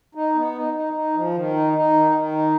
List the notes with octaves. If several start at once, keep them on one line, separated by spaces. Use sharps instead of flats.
D#4
B3
D#4
D#4
D#4
F3
D#3
D#4
D#4
D#3
D#3
D#4